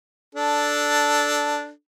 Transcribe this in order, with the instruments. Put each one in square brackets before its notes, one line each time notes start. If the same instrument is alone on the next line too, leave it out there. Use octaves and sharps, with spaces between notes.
[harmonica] D4 A4